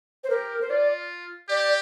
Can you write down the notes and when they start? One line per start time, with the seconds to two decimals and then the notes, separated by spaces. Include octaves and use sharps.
0.24 C5
0.30 G4 A#4
0.61 C5
0.70 F4 D5
1.49 G4 D5